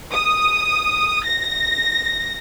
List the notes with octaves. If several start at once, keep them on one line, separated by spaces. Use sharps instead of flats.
D#6
A#6